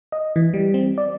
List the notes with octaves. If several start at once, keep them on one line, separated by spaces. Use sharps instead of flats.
D#5
E3
G3
C4
D5